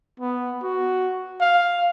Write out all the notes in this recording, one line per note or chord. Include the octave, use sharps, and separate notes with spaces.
B3
F#4
F5